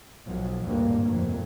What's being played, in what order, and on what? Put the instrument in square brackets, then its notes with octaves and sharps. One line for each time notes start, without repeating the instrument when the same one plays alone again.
[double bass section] B1 F3 F#3
G#1 D2 G2 A#2 A#3
F1 F2 A#2